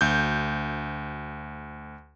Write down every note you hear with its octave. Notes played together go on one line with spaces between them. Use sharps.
D2 G6